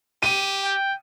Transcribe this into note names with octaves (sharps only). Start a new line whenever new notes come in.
G4 D#7
G5